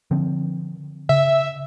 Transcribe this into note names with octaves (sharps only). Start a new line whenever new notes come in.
D3 F3 C4
C#3 E5